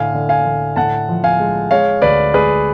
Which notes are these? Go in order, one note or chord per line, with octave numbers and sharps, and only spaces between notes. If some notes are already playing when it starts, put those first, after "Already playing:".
Already playing: A2 D3 F5 G#5
D3
F5 G#5
D3
A2 F#5 A5
F3
F5 G#5
G#3
G#3 C#5 F5
D2 B4 D5
G#3 G#4 B4